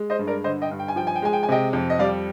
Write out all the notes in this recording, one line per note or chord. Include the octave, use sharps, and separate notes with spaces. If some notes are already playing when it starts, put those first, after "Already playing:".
Already playing: G#3
C5 D#5
G2
A#4 D5
D3 C5 D#5
D#5 G5
G2
G5
G#5
F3 G5
G#5
G5
G#3 G#5
G5
G#5
C3 D#5 G5
F2
D#5
G3 D5 F5